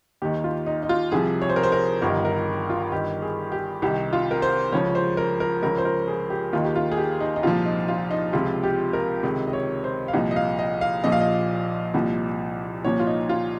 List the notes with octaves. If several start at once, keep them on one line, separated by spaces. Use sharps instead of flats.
D#2 D#3 G4
F4
D#4
D#4
F4
C2 C3 F3 G#4
C#5
C5
A#4
C5
A#4
G1 G2 D#3 A#4
A#4
F4
G1 G2 D#3 G4
G#4
G4
C2 C3 D#3 G4
F4
A#4
C5
C#2 C#3 F3 C#5
C5
A#4
A#4
C#2 C#3 F3 A#4
C5
A#4
G#4
G4
D#2 D#3 F4
G4
F4
G#4
G4
D#4
D#4
C2 A#2 F3 F4
D#4
F4
D#4
C#2 C3 F3 F4
G4
A#4
C#2 C3 D#3 D#5
D#5
C#5
C5
F5
C2 A#2 F3 D#5
D#5
F5
D#5
F5
A#1 A#2 F3 D#5
F5
D#5
C2 A#2 F3
C2 A#2 F3 C#5
F4
D#4
F4